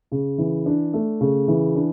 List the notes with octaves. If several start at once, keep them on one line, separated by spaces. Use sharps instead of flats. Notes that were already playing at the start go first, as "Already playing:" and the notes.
C#3
E3
D4
A3
C#3
E3
D4